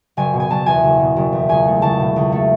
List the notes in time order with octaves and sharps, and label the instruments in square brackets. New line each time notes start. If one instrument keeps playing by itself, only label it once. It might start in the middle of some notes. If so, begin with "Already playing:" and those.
[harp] F#1 G#5
B2
G#5
F#1 A5
E2 G#5
F#1
B2
F#1
E2
C#2 G#5
A3
C#2 A5
B2
C#2
A3